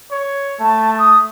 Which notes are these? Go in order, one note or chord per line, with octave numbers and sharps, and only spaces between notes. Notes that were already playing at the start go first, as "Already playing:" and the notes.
C#5
A3 A5
D#6